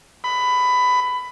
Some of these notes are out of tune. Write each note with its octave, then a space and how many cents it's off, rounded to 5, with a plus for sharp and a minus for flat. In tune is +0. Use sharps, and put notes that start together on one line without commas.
B5 +15